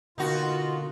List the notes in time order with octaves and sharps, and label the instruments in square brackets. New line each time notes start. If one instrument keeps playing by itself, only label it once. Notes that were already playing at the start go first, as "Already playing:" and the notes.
[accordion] B2 F4 [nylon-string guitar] D3 A#3 [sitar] D#4 F#4